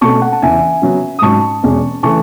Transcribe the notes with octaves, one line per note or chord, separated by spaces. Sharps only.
B2 A3 C#4 A5 C#6
F#5 A5
A5
E2 C#3 E3 E5 G#5
C#3 F#3 B3
D#6
G#2 F#3 C#4 A5 C#6
E2 B2 G#3 C#4
C#3 E3 A3 A5 C#6